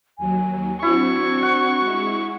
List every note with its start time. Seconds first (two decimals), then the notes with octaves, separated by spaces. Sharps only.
0.18 D#2 F#3 G#5
0.82 C4 D4 E4 F#4 C#6
1.43 F#5
1.80 G#3 E4